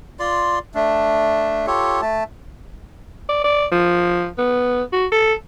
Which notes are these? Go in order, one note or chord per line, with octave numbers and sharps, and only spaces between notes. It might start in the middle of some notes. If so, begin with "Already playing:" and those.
F4 D5 C6
A3 D4
F4 G4 A4 C#5
A3 A5
D5
D5
F3
B3
F#4
A4